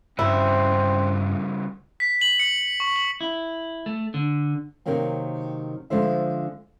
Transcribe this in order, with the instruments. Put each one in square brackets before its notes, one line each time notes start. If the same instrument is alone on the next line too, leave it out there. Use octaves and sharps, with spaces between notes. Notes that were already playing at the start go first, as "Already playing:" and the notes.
[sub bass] G2 [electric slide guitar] C#3 G3 F#4 [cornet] C4 [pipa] E4
[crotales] B6
F#7
C#7
C#6
F#7
[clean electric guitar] E4
A3
D3
[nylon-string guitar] C3 D#3 F#3 A#3 C4
D3 F3 G#3 C5 E5